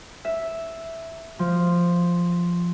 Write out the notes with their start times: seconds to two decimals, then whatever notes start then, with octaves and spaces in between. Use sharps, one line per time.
0.25 E5
1.39 F3